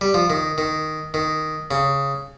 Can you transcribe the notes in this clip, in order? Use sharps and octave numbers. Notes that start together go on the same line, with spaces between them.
G3
F3
D#3
D#3
D#3
C#3